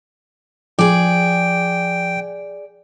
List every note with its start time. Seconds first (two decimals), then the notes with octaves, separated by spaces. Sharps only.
0.79 F3 G#4 D5 G5